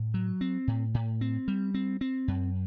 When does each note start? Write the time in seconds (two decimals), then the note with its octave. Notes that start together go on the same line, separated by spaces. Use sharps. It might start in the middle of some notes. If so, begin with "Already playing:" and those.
Already playing: A2
0.14 F#3
0.41 C4
0.67 A2
0.94 A2
1.21 C4
1.48 G3
1.74 C4
2.01 C4
2.28 F#2